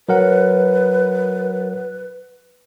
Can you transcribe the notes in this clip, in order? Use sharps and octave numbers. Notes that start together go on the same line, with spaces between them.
F#3 A#4 B4 F#5